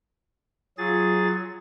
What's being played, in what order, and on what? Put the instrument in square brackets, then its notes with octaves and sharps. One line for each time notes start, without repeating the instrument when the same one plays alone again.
[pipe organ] F#3 G#4 A6 [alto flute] F4